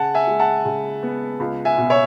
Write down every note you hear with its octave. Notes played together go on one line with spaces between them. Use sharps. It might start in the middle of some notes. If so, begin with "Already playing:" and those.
Already playing: C#3 F#5 A5
E5 G#5
G#3
F#5 A5
C#3
B3
C#2
E5 G#5
B2
C#5 E5